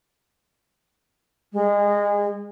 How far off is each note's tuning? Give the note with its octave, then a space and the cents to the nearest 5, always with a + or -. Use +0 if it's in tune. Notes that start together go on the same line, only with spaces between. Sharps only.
G#3 -25